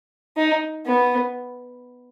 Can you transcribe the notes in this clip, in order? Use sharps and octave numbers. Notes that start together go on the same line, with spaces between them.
D#4
B3